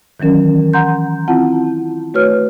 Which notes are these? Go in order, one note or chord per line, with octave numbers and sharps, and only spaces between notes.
D#3 E3 F#3 C#4 A#4
F#5 A#5 C6 G6
C4 E4 F4 F#5 A5
A3 F#4 B4 C#5 F6